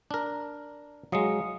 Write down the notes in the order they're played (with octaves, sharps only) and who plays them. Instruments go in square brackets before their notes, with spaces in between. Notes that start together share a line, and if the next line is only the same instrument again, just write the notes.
[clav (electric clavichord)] D4 A#4
[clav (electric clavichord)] F#3 G#3 [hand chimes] F5 D#6 C#7